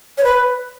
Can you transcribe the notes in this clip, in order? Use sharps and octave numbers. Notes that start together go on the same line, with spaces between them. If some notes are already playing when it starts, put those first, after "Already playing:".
C#5
B4